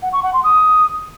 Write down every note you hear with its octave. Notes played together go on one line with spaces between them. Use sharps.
F#5
C#6
F#5
C6
D#6